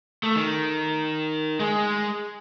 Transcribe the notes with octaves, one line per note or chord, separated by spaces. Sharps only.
A3
D#3
G#3